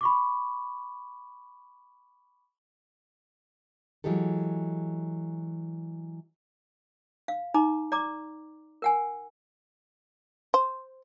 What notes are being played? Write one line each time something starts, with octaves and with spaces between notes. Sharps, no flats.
B5 C#6 D6
E3 F#3 G#3 G4 A4
F5
D#4 A#5 D6
D5 A#5 D6
A#4 F#5 G#5
C5